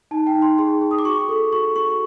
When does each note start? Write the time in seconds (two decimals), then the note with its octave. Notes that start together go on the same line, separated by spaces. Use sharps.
0.11 D#4 A5
0.27 G5
0.35 D#4
0.42 C6
0.58 G#4 C6
0.82 G#4
0.91 D#6
0.99 D6
1.05 F#4 C#6
1.29 A4
1.53 F#4 C#6
1.76 F#4 C#6